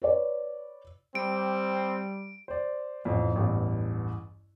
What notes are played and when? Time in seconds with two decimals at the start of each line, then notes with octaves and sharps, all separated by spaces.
0.02 B4 C#5 D5
1.15 G3 C4 D7
2.48 C5 D5
3.05 A1 F2
3.36 A1 E2 G2